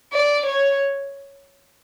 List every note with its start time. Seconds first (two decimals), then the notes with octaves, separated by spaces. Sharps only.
0.13 D5
0.46 C#5